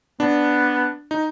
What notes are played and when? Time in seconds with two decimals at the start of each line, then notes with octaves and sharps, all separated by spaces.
0.20 B3 D4
1.11 D#4